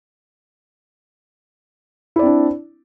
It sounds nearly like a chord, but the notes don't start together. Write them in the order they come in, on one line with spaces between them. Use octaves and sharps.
E4 D5 C4 D4